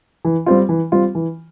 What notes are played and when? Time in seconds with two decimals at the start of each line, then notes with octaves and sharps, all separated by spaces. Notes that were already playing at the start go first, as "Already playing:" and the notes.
0.25 E3
0.46 G3 C4 F4
0.69 E3
0.92 G3 C4 F4
1.15 E3